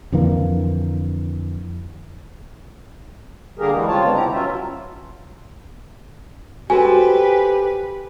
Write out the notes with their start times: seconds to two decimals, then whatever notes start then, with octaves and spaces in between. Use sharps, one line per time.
0.12 F2 D3 E3 A#3
3.59 D3 G3 A#3 G4 G#4 A#4
3.73 E3 G3 G#3
3.88 C#3 C4 F4 C#5 A5
4.03 D3 G3 G#3 B3 C4 D4
4.15 C3 E4 G4 A#5
4.32 F#3 C#4 F4 E5
6.70 F#4 G4 A4 B4 C5 G#5